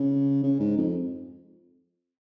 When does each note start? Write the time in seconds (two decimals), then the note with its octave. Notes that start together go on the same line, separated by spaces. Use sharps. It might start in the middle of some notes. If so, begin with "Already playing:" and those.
Already playing: C#3
0.44 C#3
0.60 G#2
0.77 F2